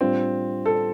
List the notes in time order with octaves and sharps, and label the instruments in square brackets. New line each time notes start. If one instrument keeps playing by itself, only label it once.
[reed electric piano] A2 G3 D4 F4 [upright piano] C4
[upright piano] A4